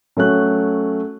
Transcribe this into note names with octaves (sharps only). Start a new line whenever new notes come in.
F#3 A3 C#4 F#6